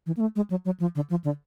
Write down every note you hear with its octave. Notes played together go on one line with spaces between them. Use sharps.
E3
A#3
A3
G#3
F#3
F#3
F3
D3
F3
D3